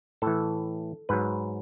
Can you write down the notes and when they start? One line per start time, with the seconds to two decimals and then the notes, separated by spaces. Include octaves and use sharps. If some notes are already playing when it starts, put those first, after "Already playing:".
0.22 A2 E3 A4
1.09 G#2 F#3 B4